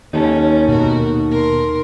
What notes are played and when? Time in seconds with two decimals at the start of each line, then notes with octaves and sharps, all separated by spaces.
0.13 D#2 C#4 D#4 A4
0.68 B2 F#4 A#4
1.31 A#4 C6